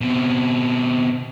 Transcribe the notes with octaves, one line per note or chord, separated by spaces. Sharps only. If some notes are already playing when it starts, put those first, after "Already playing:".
B2 C4